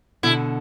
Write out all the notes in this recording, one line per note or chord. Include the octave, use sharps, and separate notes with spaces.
B2 D3 E4